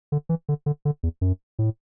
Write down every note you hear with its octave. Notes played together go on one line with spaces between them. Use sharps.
D3
E3
D3
D3
D3
E2
F#2
A2